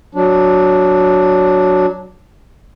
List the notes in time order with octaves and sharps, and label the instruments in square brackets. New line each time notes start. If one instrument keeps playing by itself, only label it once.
[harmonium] F#3 D4